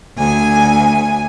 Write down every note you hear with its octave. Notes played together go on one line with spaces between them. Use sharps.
D2 G#5